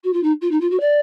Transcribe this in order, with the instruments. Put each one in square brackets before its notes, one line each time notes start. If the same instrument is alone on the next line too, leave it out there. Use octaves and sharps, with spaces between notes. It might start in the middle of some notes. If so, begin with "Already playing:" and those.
[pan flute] F#4
F4
D#4
F4
D#4
F4
F#4
D5